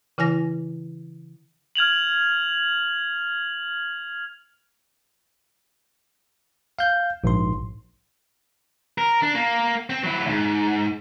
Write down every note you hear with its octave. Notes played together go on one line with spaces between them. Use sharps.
C#3 E3 E4 G#5 A#6
F6 G#6 F7 F#7
F5 G6
A#1 G#2 C6
A#4
D4
A#3
C4
F#3 E4
D2 G#2